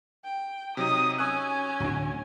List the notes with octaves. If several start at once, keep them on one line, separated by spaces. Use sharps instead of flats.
G5
C3 F#3 D#4 D#6
C#4 G#5 C#6 E6 F#6
D1 D4 F#4